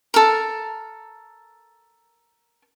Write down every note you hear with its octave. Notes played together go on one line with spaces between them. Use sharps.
A4 A#4